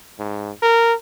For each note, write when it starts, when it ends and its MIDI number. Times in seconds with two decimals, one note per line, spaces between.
0.19 0.51 44
0.62 0.93 70